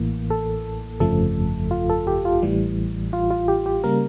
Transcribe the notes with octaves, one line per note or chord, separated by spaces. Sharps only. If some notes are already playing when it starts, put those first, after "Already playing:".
Already playing: A1 A2 E3 A#3
A4
G1 F2 C#3 F3 A3 A4
F4
A4
G4
F4
A1 A2 E3 G3
F4
F4
G4
G4
C#3 G3 A#3 A#4